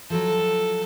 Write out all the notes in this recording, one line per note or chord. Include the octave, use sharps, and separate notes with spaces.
F3 F#3 A4